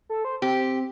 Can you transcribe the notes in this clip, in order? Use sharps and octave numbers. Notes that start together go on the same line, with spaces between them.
A4
C5
C4 G4